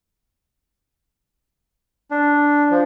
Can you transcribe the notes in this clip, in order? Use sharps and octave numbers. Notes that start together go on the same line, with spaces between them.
D4
F3